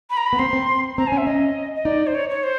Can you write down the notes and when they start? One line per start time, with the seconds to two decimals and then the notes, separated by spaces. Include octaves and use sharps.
0.10 B5
0.17 A#5
0.26 B5
0.33 B3
0.39 C4 C6
0.53 C4
0.98 C4 A#5
1.07 G#5
1.12 C#4
1.17 E5
1.27 C#4 D#5
1.76 D#5
1.85 D#4 D5
2.07 C5
2.15 C#5
2.30 C#5
2.44 C5